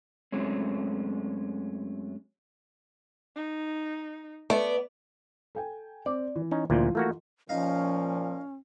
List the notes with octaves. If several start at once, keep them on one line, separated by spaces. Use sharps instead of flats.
F#2 G#3 A3 C4 C#4
D#4
A3 B3 D5
A4 G5 G#5
C4 D5
E3
C#4 D#4
D2 A#2 E3 F3 F4
A3 A#3 F#4
A#2 F3 C#4 D#4 D#5 F5